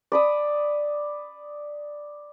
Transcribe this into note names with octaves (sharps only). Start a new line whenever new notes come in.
D5 B5 D#6